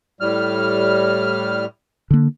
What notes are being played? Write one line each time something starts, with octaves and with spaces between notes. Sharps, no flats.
A2 G3 F6
D3 A#3